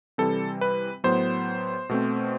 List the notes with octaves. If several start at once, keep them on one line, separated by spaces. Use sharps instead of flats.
C3 E3 G3 C4 A4
B4
A2 F#3 B3 C5
B2 A3 C4